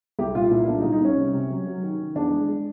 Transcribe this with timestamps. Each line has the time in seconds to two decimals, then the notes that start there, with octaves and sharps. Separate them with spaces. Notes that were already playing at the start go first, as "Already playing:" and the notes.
0.19 C2 G4
0.35 A#2 F4
0.51 A#2 E4
0.68 C2 D4
0.80 D#4
0.84 C2
0.93 D#4
1.00 C2 C#4
1.18 C3
1.34 C3
1.50 F#3
1.67 F#3
1.83 D#3
2.00 D#3
2.15 E2 D4
2.32 G#3
2.49 G#3